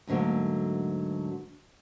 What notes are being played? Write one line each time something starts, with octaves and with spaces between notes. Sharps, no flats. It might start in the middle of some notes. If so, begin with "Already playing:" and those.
D2 G#2 D3 F#3 A#3